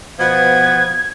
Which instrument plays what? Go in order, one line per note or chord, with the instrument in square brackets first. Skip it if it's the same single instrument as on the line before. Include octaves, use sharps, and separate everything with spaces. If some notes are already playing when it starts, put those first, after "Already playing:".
[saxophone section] B2 F3 B3 [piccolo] G#6